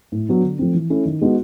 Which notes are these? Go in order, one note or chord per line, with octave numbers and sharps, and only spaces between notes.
A2
F#3 B3 D4
D3
F3 A3 C4
E3
A3 C#4 E4
D#3
G#3 B3 D#4 F#4